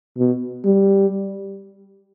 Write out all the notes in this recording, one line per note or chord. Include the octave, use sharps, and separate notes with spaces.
B2
G3